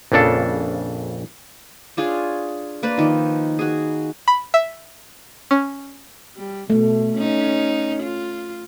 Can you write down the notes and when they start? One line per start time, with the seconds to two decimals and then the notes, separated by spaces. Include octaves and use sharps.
0.12 A#1 F2 C#3 D4 A4
1.97 D4 F4 G#4 C#5
2.83 A#3 B4 C5 D5
2.98 D#3 F3
3.59 F#4 G#4
4.28 B5
4.54 E5
5.51 C#4
6.36 G3
6.70 B2 A3
7.16 C#4 D#4
8.03 F4